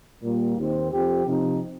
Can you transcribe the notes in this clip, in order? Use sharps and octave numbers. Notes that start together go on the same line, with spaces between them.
A#2 G3 A#3
D#2 D#3 C4
F2 F3 C4 G4
C3 F3 D#4